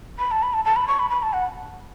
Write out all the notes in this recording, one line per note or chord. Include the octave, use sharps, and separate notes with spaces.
B5
A5
B5
A5
A5
B5
C#6
B5
B5
A5
F#5